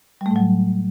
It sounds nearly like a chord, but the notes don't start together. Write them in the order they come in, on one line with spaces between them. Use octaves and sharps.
G3 A3 A2 F#3